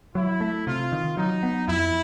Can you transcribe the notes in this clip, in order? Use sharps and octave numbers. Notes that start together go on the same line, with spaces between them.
F#3 E4
A3
C3 F4
D#3
F#3 D#4
B3
F2 E4